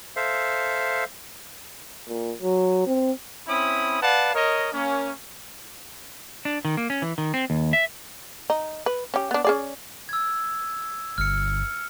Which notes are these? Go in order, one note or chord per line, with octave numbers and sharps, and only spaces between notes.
A4 C5 E5 F5
A#2
F#3
C4
C4 C#4 E4 B5 D#6
B4 D5 F5 F#5 A5
A#4 C#5 D#5
A#3 C#4
D4
D#3
A#3
C#4
E3
D#3
C4
D#2
E5
D#4
B4
C#4 G4
B3 D4
C#4 G#4 D5
E6 G#6
G1 F6 C#7